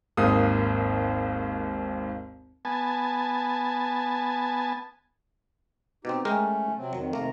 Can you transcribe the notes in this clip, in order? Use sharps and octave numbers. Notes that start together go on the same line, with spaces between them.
G#1 D#2 A#3 D#6
B3 G#5 A5
B2 C4 D#4 G4
G#3 A3 C#4 G4 A#4
C3 F#3 C4
F2 D#3 F#3
C3 D#3 A3 A#3 A#5